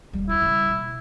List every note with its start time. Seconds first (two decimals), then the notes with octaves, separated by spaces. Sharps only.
0.13 D#1 G3
0.29 E4 F4
0.42 C#3 G3
0.69 B2 A#3